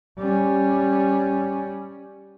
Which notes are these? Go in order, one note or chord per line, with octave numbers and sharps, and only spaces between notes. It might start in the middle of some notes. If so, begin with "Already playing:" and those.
G3 C#4